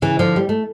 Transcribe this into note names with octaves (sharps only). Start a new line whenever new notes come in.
C#3 E3
D3 F3
G3
A3